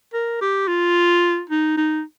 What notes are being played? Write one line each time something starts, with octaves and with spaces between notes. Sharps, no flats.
A#4
G4
F4
D#4
D#4